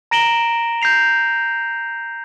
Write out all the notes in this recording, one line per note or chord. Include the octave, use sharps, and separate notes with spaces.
A#5 A#6 D7 E7 F#7 G7
G6 A#6 C7 F7